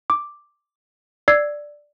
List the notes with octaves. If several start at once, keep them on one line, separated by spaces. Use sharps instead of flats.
D6
D5 E6 G#6 C7